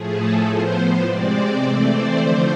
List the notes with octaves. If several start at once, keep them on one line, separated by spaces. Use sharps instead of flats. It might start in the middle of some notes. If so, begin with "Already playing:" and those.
Already playing: A2 F3 A3 G#4
A4
A2 F3 B3 C5
C3 G#3 C4 D5
E3 A3 C4 D5
C5
D3 F3 A3 C5